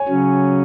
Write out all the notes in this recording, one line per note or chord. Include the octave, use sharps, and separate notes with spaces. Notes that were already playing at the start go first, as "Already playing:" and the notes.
Already playing: C#5 G#5
C#3 F#3 C#4